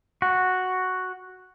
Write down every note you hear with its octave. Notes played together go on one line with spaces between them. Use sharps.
F#4